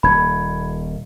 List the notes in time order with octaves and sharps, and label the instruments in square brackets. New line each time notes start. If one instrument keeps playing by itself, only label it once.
[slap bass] D#1 A#2 [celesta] B5 G#6